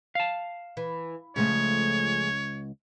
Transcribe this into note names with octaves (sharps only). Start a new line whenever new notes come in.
F5 A5
E3
C#2 C#3 F3 A3 C#5